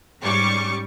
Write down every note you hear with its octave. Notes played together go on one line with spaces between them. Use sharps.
G#2 G3 C#4 C#6 D6